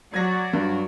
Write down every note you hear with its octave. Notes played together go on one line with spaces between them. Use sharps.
F#3 F#4 D5 G#6 A#6
G2